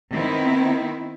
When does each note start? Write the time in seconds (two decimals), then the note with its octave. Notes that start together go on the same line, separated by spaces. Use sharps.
0.11 D#3 B3 C4 E4